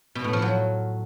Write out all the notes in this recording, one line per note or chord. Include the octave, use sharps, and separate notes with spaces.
B2
A2
F3
F#3